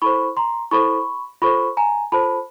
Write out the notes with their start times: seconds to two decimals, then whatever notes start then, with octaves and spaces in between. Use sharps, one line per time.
0.02 E4 A4 C5 B5 C#6
0.37 A#5 C6
0.71 E4 A4 C5 B5 C#6
1.42 F4 A4 C5 B5 C#6
1.77 G#5 A#5
2.12 F4 A4 C5 A5 B5